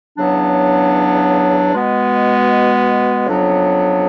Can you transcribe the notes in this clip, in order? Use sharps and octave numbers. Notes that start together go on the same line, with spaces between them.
E2 C#3 F#3 B3 D4
B2 G#3 B3
F2 C#3 F#3 B3 D4